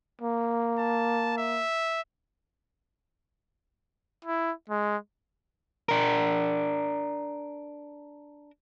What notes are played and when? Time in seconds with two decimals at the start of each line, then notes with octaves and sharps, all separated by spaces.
0.21 A#3
0.79 A5
1.38 E5
4.25 E4
4.70 G#3
5.89 D4 A#4